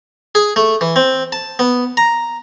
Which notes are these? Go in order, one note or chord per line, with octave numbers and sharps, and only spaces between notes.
G#4
A3
E3
C4
A5
B3
A#5